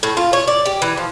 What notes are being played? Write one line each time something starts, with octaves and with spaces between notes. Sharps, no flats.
A2
F4
C#5
D5
G4
E3
F3